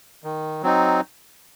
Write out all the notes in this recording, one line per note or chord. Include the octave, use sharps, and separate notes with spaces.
D#3
F#3 C4 D#4